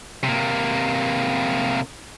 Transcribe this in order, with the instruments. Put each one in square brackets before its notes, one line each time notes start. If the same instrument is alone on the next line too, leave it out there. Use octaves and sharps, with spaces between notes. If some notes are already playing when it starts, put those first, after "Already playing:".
[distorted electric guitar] C3 A#3